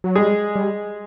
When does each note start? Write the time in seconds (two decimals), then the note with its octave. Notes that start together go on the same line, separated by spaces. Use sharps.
0.04 F#3
0.15 G3 G#3 G#4
0.56 G3